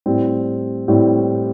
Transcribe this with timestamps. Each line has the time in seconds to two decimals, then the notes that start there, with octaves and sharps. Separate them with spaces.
0.06 A2 G3 C4
0.88 A2 G3 C4